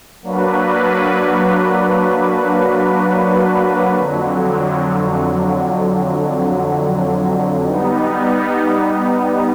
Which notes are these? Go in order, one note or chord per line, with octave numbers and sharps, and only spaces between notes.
F#3 A#3 D4 F#4 B4
F2 D3 F#3
G3 B3 D#4